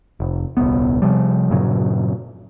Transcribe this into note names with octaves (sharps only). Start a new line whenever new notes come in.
F1
D#1 C2 B3
C3 F3 G3
G2 A#2 C#3 F#3